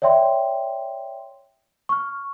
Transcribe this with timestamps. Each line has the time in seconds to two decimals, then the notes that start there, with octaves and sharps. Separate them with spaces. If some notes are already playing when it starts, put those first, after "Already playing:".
0.02 C#5 D5 E5 G5 C6
1.89 C#6 F6